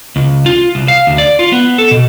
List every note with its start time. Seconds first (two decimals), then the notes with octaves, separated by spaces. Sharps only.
0.16 C#2
0.46 F4
0.75 C2
0.88 F5
1.07 D2
1.18 D5
1.39 F4
1.52 B3
1.78 A4
1.91 B2